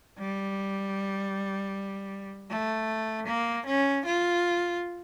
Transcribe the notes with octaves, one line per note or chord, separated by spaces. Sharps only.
G3
A3
A#3
C#4
F4